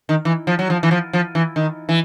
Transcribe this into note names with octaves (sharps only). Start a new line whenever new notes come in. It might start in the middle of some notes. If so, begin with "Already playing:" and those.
D#3
E3
F3
F#3
F3
E3
F3
F3
E3
D#3
E3